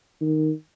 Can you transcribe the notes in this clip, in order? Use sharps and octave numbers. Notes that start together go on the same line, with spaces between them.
D#3